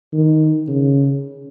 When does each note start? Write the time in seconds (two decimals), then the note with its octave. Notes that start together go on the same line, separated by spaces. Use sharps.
0.13 D#3
0.68 C#3